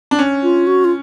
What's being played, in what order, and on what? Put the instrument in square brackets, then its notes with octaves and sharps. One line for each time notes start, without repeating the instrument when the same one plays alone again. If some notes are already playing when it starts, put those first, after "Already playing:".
[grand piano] D4
C#4
[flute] F4
F#4
F4